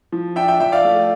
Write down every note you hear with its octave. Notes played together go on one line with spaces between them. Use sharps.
F3
D4 E5 G5
E5 G5
F3 E5 G5
D5 F5
A3